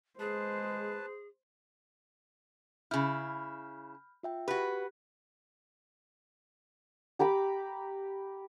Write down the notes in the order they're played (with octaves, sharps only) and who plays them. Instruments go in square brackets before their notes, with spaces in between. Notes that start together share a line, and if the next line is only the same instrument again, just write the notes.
[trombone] G#3 [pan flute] G#4 [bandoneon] B4 A5 [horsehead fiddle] C5
[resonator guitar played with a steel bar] C#3 E4 [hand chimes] B5 F6 G6
[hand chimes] F4 E5 G5
[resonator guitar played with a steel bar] F#4 B4 [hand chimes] G4 F#6
[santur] G4 A#5 B5 D6